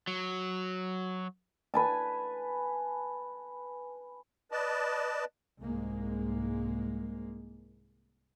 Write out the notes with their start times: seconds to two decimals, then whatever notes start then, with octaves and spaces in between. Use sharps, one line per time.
0.08 F#3
1.74 B4 G#5 A5
4.51 B4 D5 D#5 A5
5.61 C2 G#2 G#3 A#3